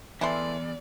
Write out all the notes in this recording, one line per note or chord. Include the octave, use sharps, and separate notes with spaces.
E2 E3 A3 D5 C6